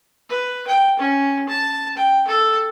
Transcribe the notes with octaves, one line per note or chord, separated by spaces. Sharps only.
B4
G5
C#4
A5
G5
A4